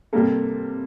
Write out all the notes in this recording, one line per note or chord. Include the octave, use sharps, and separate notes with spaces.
C3 G3 A#3 A4